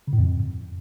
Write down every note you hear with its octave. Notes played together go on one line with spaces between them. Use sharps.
C#3
A2
F2